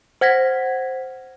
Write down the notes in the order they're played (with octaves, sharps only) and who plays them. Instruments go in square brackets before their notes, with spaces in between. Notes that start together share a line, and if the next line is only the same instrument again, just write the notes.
[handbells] C5 F#5 G#6 A#6 B6